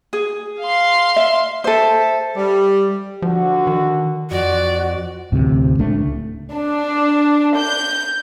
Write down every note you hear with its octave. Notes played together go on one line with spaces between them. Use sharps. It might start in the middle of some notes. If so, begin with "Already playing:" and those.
G#4
F5 C6
E5
A4 C5 E5
G3
D3 F3 F#4
D#3
F2 F#4 D5
D2 A2 C3 F3
D1 C#2 A3 D4
D4
G6